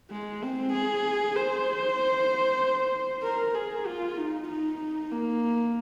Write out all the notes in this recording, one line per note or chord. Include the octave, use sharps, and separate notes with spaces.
G#3
C4
G#4
C5
A#4
G#4
F4
D#4
D#4
A#3